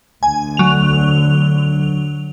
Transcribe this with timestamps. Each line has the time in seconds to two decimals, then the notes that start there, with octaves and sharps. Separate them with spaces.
0.23 D2 D3 G#5
0.57 F#3 F7